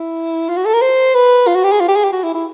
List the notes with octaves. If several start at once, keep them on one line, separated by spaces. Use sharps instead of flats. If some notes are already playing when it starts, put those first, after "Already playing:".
Already playing: E4
F4
F#4
A4
A#4
C5
B4
F4
F#4
G4
G#4
F4
G4
G#4
G4
F#4
E4
E4